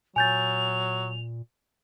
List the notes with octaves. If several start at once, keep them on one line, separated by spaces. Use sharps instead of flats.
A#2 F#3 G#5 G6 A6 F7